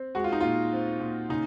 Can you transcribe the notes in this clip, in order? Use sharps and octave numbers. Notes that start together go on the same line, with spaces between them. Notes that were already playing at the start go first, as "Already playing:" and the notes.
Already playing: C4
G#3 F#4
F4
D#4
A#2 F4
C4
A#2
C#3 D#4